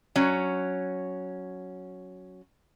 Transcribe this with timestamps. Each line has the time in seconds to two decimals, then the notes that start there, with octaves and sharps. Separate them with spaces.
0.16 F#3 C#4